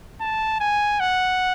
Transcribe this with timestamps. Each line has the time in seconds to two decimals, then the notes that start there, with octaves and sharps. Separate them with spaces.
0.21 A5
0.61 G#5
1.00 F#5